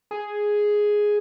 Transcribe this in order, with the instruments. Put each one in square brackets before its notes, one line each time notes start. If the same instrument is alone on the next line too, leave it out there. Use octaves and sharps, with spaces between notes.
[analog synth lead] G#4